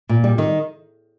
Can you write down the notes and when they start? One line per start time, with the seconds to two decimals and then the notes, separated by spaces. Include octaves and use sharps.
0.09 A#2
0.24 G3
0.38 D#3